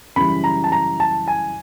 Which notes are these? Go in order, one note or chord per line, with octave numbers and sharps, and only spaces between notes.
F#2 C#3 E3 G3 B5
A#5
A5
A#5
A5
G#5